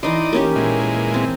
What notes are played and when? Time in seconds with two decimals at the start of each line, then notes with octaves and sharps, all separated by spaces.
0.03 E3 D#4 D5 D#5 C6
0.33 A#3 C#4 G4
0.55 A#2 E3 G#3
1.14 C4